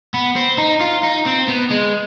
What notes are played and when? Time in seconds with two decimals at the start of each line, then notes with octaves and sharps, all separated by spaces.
0.14 B3
0.36 C4
0.58 D#4
0.80 F4
1.03 D#4
1.26 C4
1.48 B3
1.70 G#3